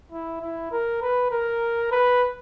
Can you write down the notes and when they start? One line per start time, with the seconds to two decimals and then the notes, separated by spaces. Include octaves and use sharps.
0.12 E4
0.42 E4
0.72 A#4
1.02 B4
1.31 A#4
1.92 B4